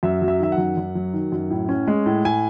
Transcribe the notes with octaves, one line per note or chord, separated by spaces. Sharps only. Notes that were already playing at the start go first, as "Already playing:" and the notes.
F#2 E5
F#3
E5
D#3 E5
F#5
F#2
F#2
F#3
D#3
F#2
A2
C#4
G#3
A2
A2 G#5